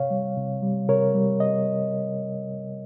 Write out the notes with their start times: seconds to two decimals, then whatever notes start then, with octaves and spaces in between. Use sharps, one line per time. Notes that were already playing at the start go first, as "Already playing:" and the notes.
Already playing: C3 C#5 F5
0.10 G3
0.37 C3
0.62 G3
0.89 C3 A#4 C#5
1.14 G3
1.40 D#5